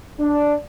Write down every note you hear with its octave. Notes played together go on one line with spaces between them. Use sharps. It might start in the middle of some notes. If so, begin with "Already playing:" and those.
D4